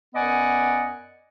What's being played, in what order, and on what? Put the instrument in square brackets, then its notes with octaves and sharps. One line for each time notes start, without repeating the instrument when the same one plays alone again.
[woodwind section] F#2 B3 D5 D#5 F#5 G#5